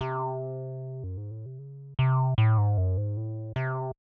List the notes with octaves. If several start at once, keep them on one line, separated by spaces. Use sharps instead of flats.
C3
F#2
G#2
A2
C3
C#3
C3
A2
G#2
F#2
G#2
A2
C3